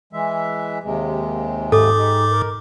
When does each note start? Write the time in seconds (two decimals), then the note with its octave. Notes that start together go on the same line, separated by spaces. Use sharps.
0.13 E3 G#3 E5
0.83 D#2 C3 G#3
1.72 G#2 A4 D6
1.98 G#3 D#4 G4
2.31 A#4